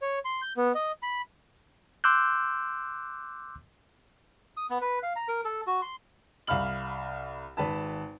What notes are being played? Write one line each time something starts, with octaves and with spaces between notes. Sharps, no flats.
C#5
C6
G6
B3
D#5
B5
C6 D6 E6 F#6 G6
D#6
B3
B4
F5
A#5
A#4
A4
F#4
C6
C2 F5 B5 F6 F#7
G#1 B4 A5